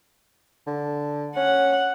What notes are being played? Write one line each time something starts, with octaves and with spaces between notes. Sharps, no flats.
D3
C#4 F#5